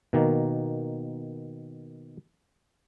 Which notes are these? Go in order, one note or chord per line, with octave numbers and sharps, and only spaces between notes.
B2 D#3 A#3